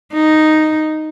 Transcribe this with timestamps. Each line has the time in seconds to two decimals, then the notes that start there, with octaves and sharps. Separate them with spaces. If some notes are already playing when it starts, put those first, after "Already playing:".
0.13 D#4